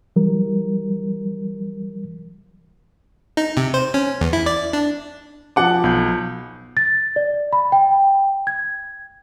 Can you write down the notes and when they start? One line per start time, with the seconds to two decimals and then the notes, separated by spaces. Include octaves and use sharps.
0.16 E3 F#3 G3 A#4
3.37 D#4
3.57 C3
3.74 C5
3.94 C#4
4.21 E2
4.33 E4
4.46 D5
4.73 D4
5.56 F3 F#5 D6
5.84 B1 G6
6.77 A6
7.16 D5
7.53 B5
7.72 G5
8.47 G#6